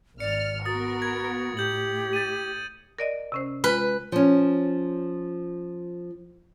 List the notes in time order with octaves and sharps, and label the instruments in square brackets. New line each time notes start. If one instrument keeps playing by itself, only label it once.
[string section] G#1 F6 [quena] D5 [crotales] C#7
[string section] B3 A#4 [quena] F#4 [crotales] D#6 A6
[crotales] G#6
[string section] A2 [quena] G4 [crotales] G6 F#7
[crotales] A6 D#7
[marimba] A#4 D5 D#5
C3 C#4 C5
[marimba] G#3 F4 [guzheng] B4
[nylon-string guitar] F3 C#4